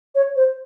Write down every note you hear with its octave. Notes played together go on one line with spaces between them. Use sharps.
C#5
C5